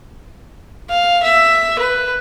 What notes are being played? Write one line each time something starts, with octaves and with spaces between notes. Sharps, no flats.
F5
E5
B4